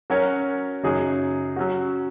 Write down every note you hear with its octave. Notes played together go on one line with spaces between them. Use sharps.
F#3 C#4 F#4 A#4 C#5
F#2 C#3 F#3 D#4 G#4
F#3 C#4 F#4